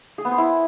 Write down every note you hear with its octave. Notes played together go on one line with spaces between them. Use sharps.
G#4
B3
C5
E4